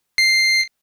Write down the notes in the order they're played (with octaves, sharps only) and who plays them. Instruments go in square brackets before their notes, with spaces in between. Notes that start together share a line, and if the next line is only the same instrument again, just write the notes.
[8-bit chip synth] C7